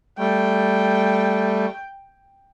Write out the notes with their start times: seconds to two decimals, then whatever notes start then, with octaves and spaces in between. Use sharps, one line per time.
0.19 G3 A3 G5